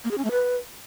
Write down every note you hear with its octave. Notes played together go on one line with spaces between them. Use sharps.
A#3
G#4
C#4
A3
B4